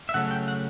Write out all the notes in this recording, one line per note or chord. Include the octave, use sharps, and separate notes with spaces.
E5
C#3 F#3 A3 C#4 F#5
G5
F#5